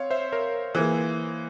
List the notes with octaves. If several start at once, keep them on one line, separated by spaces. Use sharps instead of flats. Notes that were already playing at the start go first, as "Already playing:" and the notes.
Already playing: C4 C#5 F5
C5 E5
A#4 C#5
E3 A#3 G#4 C5